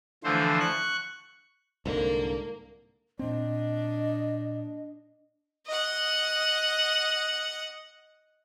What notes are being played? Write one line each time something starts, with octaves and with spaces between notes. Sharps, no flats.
D3 E3 F3 A3 C5
C#6 F#6
C2 G#2 D3 A#3
A#2 C4 D4 D#5
D#5 F#5